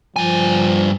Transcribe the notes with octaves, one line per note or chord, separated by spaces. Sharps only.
G2 F3 G#5